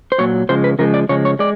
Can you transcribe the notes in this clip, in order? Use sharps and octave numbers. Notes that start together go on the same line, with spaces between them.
C5
A#2 F#3 C#5
C#3 F3 G#3 C5
B4
C#3 F3 G#3 A#4
D5
C#3 F3 G#3 C#5
C#5
G#3 D5